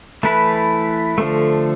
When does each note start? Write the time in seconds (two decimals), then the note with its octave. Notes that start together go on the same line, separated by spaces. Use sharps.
0.23 E3 A3 E4 B4
1.18 D3 F3 A3